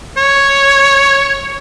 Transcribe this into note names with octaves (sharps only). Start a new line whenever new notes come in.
C#5